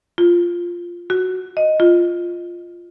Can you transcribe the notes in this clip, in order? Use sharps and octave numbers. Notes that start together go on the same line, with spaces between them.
F4
F#4
D#5
F4